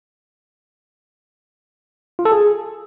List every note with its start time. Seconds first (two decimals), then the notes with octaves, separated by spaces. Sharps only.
2.19 F4
2.25 A4
2.32 G#4